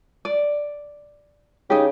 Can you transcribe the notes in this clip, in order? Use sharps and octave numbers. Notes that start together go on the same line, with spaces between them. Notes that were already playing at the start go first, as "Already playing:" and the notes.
D5
C#3 D#4 G4